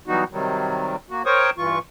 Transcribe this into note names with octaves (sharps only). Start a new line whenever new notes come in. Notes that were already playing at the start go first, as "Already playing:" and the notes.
E3 F#3 G3 B3 D#4 F#4
C3 D#3 F#3 G3
A#3 F#4
A#4 C5 C#5 G5 C#6 D#6
G2 E3 F4 C#6